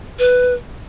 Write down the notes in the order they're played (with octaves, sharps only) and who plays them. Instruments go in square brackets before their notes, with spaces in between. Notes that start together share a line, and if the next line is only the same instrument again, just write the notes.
[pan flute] B4